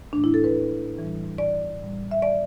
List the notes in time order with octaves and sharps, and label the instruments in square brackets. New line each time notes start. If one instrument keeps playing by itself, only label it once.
[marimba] A2 E3 A3 D4
E4
A4
B4
A2 E3 G3
D5
A2 G3
E5
D5